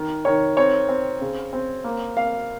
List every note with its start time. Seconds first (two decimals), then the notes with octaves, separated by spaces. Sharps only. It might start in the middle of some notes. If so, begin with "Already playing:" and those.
Already playing: D#3
0.25 D#3 C#5
0.57 C4 C#5
0.89 C4
1.21 C#3
1.53 C4
1.84 A#3
2.17 A#3 F5